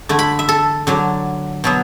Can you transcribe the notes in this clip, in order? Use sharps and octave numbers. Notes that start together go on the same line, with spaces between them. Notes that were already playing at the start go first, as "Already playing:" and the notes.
D3 A3 E4
B5
E5
A4
D3 F#3 D4
B2 F#3 B3